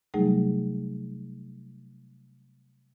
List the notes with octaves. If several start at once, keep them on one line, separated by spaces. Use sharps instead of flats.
C3 F#3 G3 A3 D#4 G#4